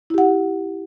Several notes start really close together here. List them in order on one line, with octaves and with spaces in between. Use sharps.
E4 G4 F#5